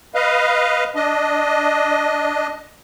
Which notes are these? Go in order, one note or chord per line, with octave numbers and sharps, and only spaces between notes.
B4 D#5 F5
D4 D#5